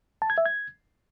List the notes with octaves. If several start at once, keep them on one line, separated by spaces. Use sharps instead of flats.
A5
G#6
E5
G#6